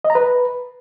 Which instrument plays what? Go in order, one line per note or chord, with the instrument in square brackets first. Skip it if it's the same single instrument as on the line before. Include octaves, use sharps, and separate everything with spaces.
[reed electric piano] D#5
A#5
B4